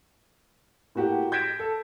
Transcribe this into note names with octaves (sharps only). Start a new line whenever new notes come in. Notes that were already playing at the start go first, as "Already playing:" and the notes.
A2 A#3 F#4 G4
G6 G#6 A#6 B6 D7 E7
A4